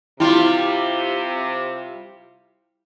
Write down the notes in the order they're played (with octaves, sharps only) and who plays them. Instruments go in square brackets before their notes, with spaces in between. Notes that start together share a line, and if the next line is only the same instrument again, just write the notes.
[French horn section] C3 [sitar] G3 F4 [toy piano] E4